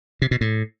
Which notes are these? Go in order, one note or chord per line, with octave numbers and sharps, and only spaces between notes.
C3
B2
A2